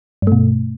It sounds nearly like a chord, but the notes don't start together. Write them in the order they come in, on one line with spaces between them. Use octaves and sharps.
G2 A3 B2